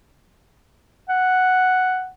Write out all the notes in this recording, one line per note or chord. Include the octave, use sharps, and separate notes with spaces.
F#5